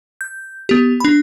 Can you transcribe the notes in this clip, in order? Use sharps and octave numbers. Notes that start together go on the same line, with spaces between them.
G6
B3 G4
D4 B5